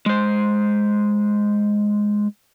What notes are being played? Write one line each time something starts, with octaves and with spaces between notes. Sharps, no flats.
G#3 C5